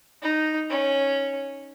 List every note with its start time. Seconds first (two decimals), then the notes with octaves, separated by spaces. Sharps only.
0.22 D#4
0.70 C#4